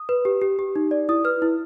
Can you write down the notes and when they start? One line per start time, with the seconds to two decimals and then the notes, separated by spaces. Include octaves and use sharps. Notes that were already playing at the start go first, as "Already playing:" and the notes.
Already playing: D#6
0.09 B4
0.25 G4
0.41 G4
0.59 G4
0.76 D#4
0.91 D5
1.09 E4 D#6
1.24 B4 F6
1.42 E4